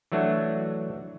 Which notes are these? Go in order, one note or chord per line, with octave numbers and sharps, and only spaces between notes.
E3 F#3 A3 D4 F#4